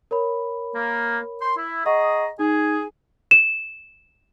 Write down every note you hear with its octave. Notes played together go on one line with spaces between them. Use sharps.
A#4 C#5 B5
A#3
C6
E4
G#4 D#5 F#5 A#5 C#6 D#6
D#4 G#4
E7